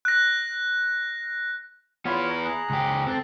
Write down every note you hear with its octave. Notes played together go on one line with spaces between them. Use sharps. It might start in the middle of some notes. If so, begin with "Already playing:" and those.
F#6 A#6
B3 E4 F4 C#5 F6
A#5
G#4 A#5 F#6
C#2 G4
C4 A4 A5